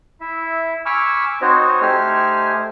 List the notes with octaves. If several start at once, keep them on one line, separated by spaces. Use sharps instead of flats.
E4 E5
G#5 B5 C#6 D6 E6 F6
C4 D#4 F#4 C5 C#5 D#5
A3 D#4 G4 C5 G#5 F6